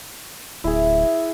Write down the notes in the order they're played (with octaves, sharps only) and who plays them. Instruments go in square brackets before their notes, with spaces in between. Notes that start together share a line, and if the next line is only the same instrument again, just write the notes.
[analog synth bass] D1 [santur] E4 G#4